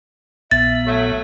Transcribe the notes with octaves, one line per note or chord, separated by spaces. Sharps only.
A#1 A#2 B3 E5 A6
F#3 A3